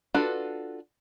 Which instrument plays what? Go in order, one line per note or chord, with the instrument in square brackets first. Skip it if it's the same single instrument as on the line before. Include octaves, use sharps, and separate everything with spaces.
[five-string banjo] D4 F4 F#4 A4 B4